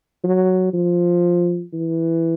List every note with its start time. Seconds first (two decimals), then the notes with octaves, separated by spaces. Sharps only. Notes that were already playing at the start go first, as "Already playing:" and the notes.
0.24 F#3
0.73 F3
1.73 E3